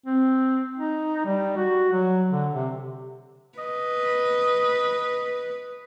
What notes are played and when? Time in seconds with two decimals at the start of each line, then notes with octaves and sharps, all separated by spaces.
0.06 C4
0.76 D#4
1.25 G3
1.57 F#4
1.93 F#3
2.32 D3
2.54 C3
3.58 B4 D#5